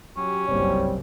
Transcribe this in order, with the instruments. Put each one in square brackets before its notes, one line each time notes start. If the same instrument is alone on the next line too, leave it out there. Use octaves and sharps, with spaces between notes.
[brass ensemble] F#3 G4 [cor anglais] C#4
[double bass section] F#1 C2 G2 [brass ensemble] G3 C4 [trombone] C#5